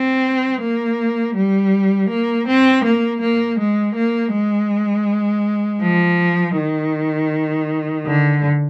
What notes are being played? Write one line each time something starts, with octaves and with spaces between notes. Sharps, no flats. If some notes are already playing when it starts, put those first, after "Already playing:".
Already playing: C4
A#3
G3
A#3
C4
A#3
A#3
G#3
A#3
G#3
F3
D#3
D3